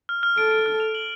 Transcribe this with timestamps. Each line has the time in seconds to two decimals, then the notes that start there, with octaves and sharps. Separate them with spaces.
0.09 F6
0.23 F6
0.38 A4 D7
0.51 D7
0.66 F6
0.80 F7
0.95 F#7